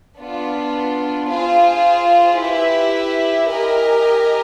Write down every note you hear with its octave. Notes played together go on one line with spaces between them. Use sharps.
B3 D4 F4
F4 G#4 C5
E4 G4 B4 E5
G4 A#4 D#5 G#5